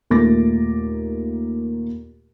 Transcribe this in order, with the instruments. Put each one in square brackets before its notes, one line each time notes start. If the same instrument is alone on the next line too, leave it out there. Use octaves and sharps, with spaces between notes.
[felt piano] D#2 A#2 A3 D6 A6 A#6